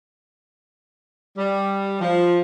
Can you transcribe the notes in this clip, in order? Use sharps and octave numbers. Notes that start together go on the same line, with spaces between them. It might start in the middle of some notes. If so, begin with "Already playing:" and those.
G3
F3